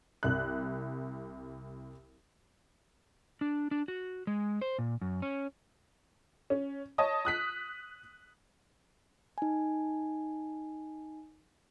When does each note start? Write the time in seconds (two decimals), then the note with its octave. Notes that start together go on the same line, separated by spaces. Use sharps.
0.23 C2 F#6
3.41 D4
3.71 D4
3.88 F#4
4.27 G#3
4.62 C5
4.79 A#2
5.01 F#2
5.22 C#4
6.50 C#4
6.98 C#5 D#5 A5 D#6
7.25 D#6 F#6 B6
9.38 D#4 G#5